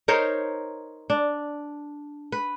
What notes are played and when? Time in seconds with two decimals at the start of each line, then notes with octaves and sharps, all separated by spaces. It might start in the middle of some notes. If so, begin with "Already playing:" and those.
0.08 D#4 A#4 C5 C#5
1.10 D4
2.32 B4